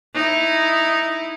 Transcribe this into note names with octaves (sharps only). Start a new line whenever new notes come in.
D#4 E4